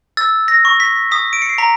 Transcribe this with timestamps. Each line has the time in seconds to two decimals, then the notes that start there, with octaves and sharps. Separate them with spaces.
0.17 E6 A6
0.48 A#6
0.65 C#6
0.80 B6
1.11 D#6 B6
1.33 D7
1.42 C#7
1.49 C7
1.58 A#5 B6